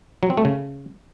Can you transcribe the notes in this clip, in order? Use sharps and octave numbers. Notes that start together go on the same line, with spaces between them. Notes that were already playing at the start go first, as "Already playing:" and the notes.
F#3
C4
A3
C#3